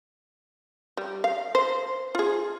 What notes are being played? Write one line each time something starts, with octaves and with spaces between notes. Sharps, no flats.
G3
F5
C5
F4 G#4